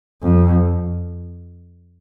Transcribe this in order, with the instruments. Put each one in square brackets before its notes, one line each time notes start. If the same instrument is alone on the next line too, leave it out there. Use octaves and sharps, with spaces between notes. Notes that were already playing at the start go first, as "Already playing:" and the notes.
[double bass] F2